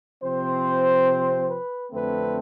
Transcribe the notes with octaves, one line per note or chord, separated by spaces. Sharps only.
C3 F3 C4 C5
B4
F2 D3 A3 C4 B4